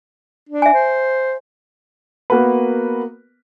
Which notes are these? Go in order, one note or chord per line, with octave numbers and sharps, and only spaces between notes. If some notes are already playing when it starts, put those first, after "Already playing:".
D4
E5 G#5
C5
A#3 B3 F#4 A#4 B4